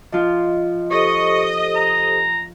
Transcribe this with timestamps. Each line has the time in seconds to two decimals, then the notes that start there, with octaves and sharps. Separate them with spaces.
0.12 F3 F4 D#5
0.91 G4 A4 C5 D#5 C#6
1.76 A#5